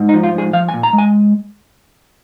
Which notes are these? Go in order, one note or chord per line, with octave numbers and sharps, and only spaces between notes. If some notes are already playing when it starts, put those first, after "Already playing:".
Already playing: G#2
D#4
F3
F4
G#2 G#4
F3 F5
G#5
A#2
A#5
G#3
G#5